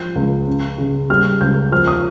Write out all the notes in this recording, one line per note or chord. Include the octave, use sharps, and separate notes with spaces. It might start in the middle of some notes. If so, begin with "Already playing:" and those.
Already playing: F3 G6
C#2
C#4
C#3
G3 F6
C#2 G6
F3 F6
D#6